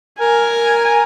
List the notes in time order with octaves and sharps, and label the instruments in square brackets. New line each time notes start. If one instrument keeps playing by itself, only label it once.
[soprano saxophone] A#4 [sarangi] G#5